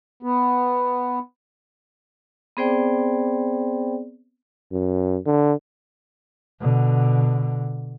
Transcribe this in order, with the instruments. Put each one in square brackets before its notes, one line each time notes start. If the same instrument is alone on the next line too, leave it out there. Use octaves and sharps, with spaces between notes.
[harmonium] B3
[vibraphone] B3 C4 G#4 C5 D5 G5
[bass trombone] F#2
D3
[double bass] B2 D3